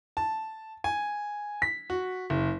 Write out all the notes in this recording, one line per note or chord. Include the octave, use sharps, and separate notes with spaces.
A5
G#5
B6
F#4
F#1